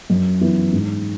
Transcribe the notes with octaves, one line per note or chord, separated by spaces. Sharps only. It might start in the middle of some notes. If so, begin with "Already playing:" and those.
F#2
E3 B3 E4
G#2